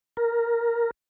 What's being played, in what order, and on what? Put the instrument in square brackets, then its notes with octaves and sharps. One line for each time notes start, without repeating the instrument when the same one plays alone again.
[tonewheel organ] A#4